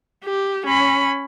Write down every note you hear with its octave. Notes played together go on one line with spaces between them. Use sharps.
G4
C#4 B5